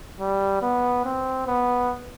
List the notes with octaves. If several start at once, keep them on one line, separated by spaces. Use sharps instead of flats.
G3
B3
C4
B3